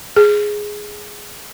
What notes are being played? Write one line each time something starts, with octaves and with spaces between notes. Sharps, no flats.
G#4